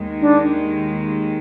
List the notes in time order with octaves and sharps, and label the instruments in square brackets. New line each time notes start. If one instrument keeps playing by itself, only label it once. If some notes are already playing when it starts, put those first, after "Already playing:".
Already playing: [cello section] D#2 D#3 G#3
[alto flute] D4